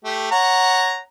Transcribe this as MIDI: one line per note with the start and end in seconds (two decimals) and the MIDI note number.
0.04 0.27 57
0.04 0.27 67
0.31 1.00 73
0.31 1.00 78
0.31 1.00 82